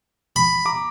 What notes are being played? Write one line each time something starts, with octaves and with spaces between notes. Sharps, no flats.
B5
A#5 D6